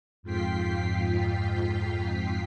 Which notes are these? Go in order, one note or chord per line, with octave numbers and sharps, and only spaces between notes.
F2 G#2 F4 G5 B6 C7